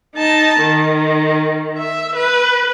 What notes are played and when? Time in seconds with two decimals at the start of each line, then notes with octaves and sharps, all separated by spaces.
0.16 D#4 A5
0.60 D#3
1.78 E5
2.16 B4